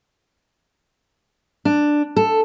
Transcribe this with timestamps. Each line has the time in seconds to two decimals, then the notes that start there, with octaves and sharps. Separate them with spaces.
1.65 D4
2.16 A4